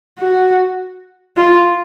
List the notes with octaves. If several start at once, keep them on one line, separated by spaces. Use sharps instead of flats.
F#4
F4